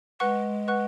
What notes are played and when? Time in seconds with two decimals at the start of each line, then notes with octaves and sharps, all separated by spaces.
0.20 G#3 B4 F#5 C#6 F#6
0.68 B4 F#5 C#6 F#6